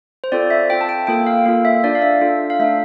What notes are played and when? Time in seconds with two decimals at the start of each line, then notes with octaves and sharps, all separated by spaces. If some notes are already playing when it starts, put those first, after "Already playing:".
0.24 C5
0.32 C4 F4 A4 D5
0.50 E5
0.70 C4 F4 A4 G5
0.81 A5
0.89 G5
1.07 A#3 F4 A4 G5
1.27 F5
1.45 A#3 F4 A4 F5
1.65 E5
1.84 D4 F4 A4 D5
1.95 F5
2.02 E5
2.21 D4 F4 A4
2.50 F5
2.59 A3 D4 A4 E5